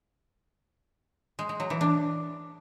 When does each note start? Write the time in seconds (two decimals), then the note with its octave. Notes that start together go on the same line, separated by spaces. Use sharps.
1.39 G#3
1.49 G#3
1.60 F#3
1.70 E3
1.81 D4